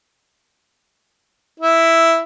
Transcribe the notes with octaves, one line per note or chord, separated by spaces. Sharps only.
E4